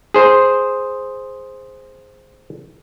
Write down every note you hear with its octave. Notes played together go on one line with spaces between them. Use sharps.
G#4 C5